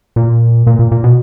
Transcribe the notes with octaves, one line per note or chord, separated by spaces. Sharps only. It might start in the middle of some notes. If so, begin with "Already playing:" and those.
A#2
A#2
A#2
A#2
B2